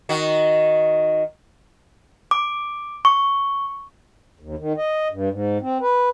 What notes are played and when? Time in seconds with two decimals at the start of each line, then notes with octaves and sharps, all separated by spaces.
0.09 D#3 F#4
2.31 D6
3.05 C#6
4.40 D#2
4.59 D#3
4.78 D#5
5.11 G2
5.30 G#2
5.61 C4
5.81 B4